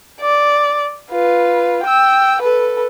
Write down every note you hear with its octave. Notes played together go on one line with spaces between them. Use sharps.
D5
F4 B4
G5 E6
A4 B4